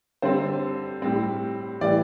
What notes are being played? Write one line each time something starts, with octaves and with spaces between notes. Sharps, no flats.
D3 G3 C4 C5
A2 G3 C4
A2 E3 G3 D5